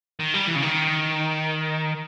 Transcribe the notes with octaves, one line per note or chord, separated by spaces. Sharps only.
D#3
G3
E3
C#3
D#3